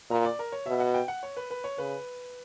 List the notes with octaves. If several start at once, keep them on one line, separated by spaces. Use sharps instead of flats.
A#2 A#5
D5
A#4
C#5
B2 E5
F#5
G5
F#5
C#5
B4
B4
C#5
C#3 B4